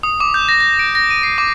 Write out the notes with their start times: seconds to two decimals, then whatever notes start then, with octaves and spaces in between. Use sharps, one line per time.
0.03 D#6
0.20 D6
0.34 G6
0.49 A#6
0.60 A#6
0.79 D7
0.95 A#6
1.10 D#7
1.23 C7
1.38 D6